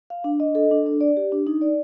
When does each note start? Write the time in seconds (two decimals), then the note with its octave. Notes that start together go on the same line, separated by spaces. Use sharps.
0.10 F5
0.24 D4
0.40 D#5
0.55 A4
0.71 D4
0.86 D4
1.01 D5
1.17 G4
1.32 D4
1.47 D#4
1.61 D5